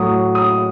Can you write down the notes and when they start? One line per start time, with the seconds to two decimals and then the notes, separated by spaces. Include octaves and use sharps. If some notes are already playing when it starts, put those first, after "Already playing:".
Already playing: A2 F#3 D#6
0.35 D#6